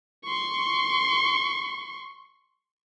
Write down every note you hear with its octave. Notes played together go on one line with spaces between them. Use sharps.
C6 C#6